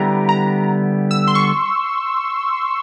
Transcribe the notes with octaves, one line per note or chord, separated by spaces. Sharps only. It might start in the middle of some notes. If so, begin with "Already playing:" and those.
Already playing: D3 G3 B3 E4 G4 A#5
A#5
E6
C6
C#6